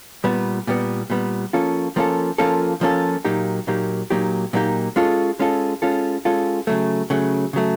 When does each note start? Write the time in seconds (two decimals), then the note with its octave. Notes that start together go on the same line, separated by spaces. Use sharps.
0.24 A#2 G3 B3
0.67 A#2 G3 B3
1.10 A#2 G3 B3
1.53 F3 A#3 C#4 F4 A4
1.96 F3 A#3 C#4 F4 A4
2.38 F3 A#3 C#4 F4 A4
2.81 F3 A#3 C#4 F4 A4
3.25 A#2 F#3 A#3 D#4 G4
3.67 A#2 F#3 A#3 D#4 G4
4.10 A#2 F#3 A#3 D#4 G4
4.53 A#2 F#3 A#3 D#4 G4
4.96 G#3 C#4 F4 A4
5.39 G#3 C#4 F4 A4
5.82 G#3 C#4 F4 A4
6.25 G#3 C#4 F4 A4
6.67 C#3 F#3 A3
7.10 C#3 F#3 A3
7.53 C#3 F#3 A3